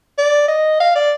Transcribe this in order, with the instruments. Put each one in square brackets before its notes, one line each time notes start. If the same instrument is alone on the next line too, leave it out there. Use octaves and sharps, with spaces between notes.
[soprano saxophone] D5
D#5
F5
D5